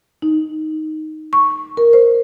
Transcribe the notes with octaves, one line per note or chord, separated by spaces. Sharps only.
D#4
C#6
A#4
C5